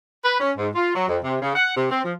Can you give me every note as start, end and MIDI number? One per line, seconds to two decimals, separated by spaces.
0.25 0.39 71
0.40 0.51 61
0.58 0.69 44
0.75 0.92 65
0.95 1.07 54
1.08 1.18 41
1.23 1.37 48
1.42 1.54 49
1.55 1.73 78
1.76 1.90 48
1.90 2.02 60
2.05 2.13 53